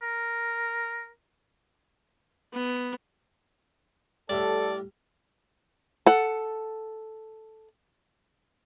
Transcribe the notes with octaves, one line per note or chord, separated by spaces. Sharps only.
A#4
B3
A2 G3 A4 D5
A4 F#5